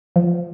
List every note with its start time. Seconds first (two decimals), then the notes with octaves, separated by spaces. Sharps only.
0.16 F3